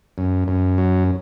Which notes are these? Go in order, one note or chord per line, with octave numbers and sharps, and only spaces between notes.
F#2
F#2
F#3